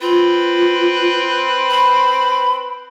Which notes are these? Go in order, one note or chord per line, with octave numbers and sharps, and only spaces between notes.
C4 F4 B4
B5